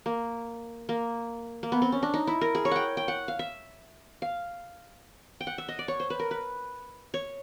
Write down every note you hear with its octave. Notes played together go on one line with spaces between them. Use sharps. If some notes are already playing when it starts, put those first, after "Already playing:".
A#3
A#3
A#3
B3
C4
C#4
D4
D#4
E4
A#4
G#4
C#5
F#5 G5
G5
F#5
F5
E5
F5
G5
F#5
E5
D#5
D5
C#5
C5
B4
A#4
B4
C#5